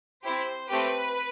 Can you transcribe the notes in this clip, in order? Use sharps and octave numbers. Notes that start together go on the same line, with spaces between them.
C4 E4 G4 C5
A3 C4 G4 B4